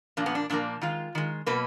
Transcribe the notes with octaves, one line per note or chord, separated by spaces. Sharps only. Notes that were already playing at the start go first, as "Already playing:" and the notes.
A#2 F3 A#3 D4
B3
D4
A#2 F3 A#3 D4
D#3 G#3 F4
D#3 G#3
B2 F#3 A#3 B4